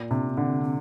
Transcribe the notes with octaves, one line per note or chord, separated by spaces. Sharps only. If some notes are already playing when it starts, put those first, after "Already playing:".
Already playing: A#2
C3 D4
A#3
D3 C4
C4